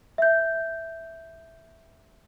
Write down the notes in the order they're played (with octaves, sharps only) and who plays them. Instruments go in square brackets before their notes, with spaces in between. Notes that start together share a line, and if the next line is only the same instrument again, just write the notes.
[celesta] E5 G6